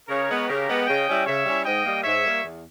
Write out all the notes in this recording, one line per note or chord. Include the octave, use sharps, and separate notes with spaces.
C#3 A#4 C#5
G#3 B3
C#3 G4 A#4
G#3 B3
C#3 D#5 G5
G3 C#4 E4
C#3 C#5 E5
G3 C#4 E4
G#2 D#5 G5
G3 A#3
G#2 C#5 E5
G3 A#3
E2